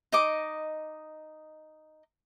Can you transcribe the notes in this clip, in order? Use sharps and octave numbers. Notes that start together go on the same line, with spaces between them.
D#4 D#5 D6